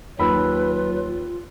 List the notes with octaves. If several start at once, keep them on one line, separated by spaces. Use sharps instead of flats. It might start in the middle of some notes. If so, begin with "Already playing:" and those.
D#2 F#3 F4 B4 B5 E6